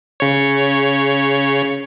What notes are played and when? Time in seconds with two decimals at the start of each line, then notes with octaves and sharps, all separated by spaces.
0.20 C#3 C#5